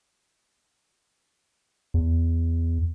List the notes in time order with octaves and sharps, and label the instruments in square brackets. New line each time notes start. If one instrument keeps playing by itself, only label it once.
[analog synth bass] E2